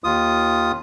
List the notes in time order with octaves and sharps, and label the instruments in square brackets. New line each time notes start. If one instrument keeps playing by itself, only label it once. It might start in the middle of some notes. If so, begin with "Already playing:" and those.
[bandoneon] D#2 F4 D#6